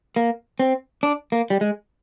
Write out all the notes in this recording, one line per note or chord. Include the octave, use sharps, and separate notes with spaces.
A#3
C4
D4
A#3
G3
G#3